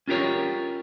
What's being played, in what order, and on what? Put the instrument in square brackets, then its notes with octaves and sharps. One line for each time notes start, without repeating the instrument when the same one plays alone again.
[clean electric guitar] C#4 F4 G4 A#4 C#5